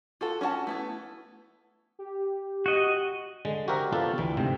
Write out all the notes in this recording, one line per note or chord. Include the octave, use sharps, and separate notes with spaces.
F4 F#4 A4
C#4 D4 F#4 F#5 A5
A3 B3 E4
G4
F#4 D#5
D3 G#3
F#4 G4 A#4 C5 E5 F#5
B3 D4 F4 G4 A4
D2 E3
G#2 C3 C4